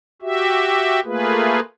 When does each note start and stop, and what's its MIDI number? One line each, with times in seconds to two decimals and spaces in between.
0.22 1.00 66
0.22 1.00 67
0.22 1.00 76
1.05 1.60 57
1.05 1.60 58
1.05 1.60 65
1.05 1.60 68
1.05 1.60 71